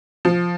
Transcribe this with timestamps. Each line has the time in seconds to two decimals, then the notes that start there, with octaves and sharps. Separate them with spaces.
0.25 F3